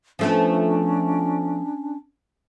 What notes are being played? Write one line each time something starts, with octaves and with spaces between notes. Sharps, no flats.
F3 A3 B3 C#4 D4